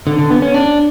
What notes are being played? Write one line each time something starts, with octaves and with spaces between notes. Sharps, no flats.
D3
D3
B3
C#4
D4